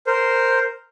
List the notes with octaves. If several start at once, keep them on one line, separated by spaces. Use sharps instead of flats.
A#4 C5